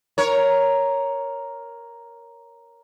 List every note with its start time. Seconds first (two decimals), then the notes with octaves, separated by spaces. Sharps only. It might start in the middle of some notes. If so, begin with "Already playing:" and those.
0.18 A#4 C#5